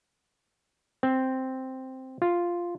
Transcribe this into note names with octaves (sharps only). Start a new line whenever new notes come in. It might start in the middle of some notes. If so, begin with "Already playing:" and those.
C4
F4